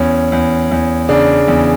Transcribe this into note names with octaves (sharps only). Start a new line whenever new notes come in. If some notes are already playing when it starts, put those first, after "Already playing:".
Already playing: E2 C#4
E2
E2
C#3 D4
E2